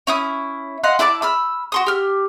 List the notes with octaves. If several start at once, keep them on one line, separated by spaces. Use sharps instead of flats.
C#4 E4 D#6
D#5 F5 F#5 C6
E4 D5 A5 D6
B5 E6 F6
F#4 C6 D#6
G4 F6